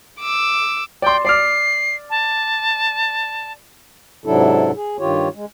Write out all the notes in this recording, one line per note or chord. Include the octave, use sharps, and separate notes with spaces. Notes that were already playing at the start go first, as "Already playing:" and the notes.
D6 E6
D5 G5 C6
D5 D6 F6 C7
A5
G#2 C3 F#3 D4 E4 A4
G#4
G2 D#3 F4 G4 C#5
G#3